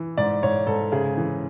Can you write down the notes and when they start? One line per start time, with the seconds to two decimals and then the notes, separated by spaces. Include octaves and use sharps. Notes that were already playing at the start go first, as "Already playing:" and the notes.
Already playing: E3
0.17 G#2 D5
0.43 G#2 C#5
0.67 G#2 A4
0.92 C#3 G#4
1.17 E3